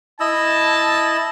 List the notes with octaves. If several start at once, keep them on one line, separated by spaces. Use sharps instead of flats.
E4 D#5 A5 E6